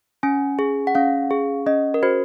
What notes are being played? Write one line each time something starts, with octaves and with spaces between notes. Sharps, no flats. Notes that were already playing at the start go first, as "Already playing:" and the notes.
C#4 G#5
G#4
F#5
C#4 F5
G#4
C#4 D#5
A#4
F#4 C5